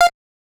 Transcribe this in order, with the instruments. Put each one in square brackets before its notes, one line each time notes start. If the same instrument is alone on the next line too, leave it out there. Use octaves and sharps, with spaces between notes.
[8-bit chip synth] F5